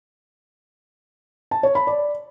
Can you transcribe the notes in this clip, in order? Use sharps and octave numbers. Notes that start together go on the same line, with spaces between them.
A5
C#5
B5
D5